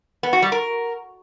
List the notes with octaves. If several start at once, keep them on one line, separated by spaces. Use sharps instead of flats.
B3
F#4
G3
A#4